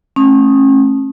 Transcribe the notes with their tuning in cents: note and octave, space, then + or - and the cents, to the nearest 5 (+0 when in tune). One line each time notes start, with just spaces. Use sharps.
A3 -15 C#4 -35 D#6 +0